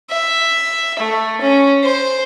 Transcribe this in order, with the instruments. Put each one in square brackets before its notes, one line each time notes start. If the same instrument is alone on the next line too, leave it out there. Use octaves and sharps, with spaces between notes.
[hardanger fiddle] E5
A3
C#4
C5